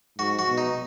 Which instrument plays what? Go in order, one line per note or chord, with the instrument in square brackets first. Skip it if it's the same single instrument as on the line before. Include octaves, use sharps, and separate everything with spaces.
[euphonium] G#2 [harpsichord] F#4
[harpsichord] F#4
[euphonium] B2
[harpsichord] D#4